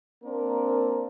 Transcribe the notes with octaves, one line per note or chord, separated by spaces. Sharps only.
A#3 C4 D4 A#4